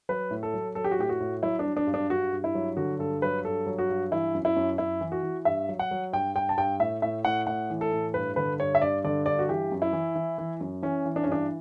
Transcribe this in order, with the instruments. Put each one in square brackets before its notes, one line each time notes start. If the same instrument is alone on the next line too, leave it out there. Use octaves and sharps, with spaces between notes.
[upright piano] F#3 B4
A2
A4
F#3
F#3 A4
G4
F#4
A2 G4
F#4
A2
F#3 E4
D4
F#3
D4
G2
D4
G2 F#4
G2
E4
F#3
D3 F#4
G2 A4
F#3 B4
G2 A4
F#3
F#4
G2
E3 E4
F#2
E4
F#2
F#2 E4
E3
F#4
E3
G2 E5
F#3
F#5
F#3
G2 G5
G2 G5
A5
G2 G5
A2 E5
A2 E5
A2 F#5
A2 F#5
E3
A4
A2
G2 B4
D3 B4
G2 C#5
E5
G2 D5
D3 D5
G2 D5
F#4
E3 G4
F#2
E4
E3
E3
E3
F#2
E3 C#4
E3
D4
C#4
G2 D4